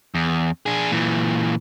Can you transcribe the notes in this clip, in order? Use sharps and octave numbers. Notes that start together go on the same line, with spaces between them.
E2
D4 G#4
A#2 E3